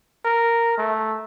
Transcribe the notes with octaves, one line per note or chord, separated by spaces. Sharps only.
A#4
A3